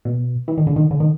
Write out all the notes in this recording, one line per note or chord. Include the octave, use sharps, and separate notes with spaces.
B2
E3
D#3
D3
D#3
D3
D#3